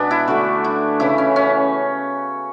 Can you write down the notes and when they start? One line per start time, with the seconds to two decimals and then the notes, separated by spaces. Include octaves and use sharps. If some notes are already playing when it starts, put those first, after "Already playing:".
Already playing: B2 G#3 B3 D4
0.11 E4
0.28 D3 A3 F#4
0.64 E4
1.00 C#3 E3 A3 E4
1.18 C#4
1.36 C#4